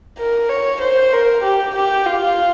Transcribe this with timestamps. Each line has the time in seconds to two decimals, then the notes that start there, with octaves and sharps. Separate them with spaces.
0.18 A#4
0.49 C#5
0.81 C5
1.13 A#4
1.43 G4
1.75 G4
2.06 F4